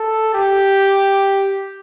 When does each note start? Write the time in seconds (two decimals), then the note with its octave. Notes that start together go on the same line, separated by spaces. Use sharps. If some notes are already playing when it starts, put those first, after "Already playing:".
Already playing: A4
0.34 G4